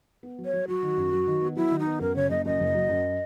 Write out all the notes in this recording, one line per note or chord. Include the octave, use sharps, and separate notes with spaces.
B3
F#3
C#5
F#3
F#3 F#4
D#3
F#2
F#3
D#3
B3
F#3 E4
D#3
D#4
B3
F#2 A#4
C#3 C#5
F#1 D#5
F#2 D#5
F#1
F#3
F#2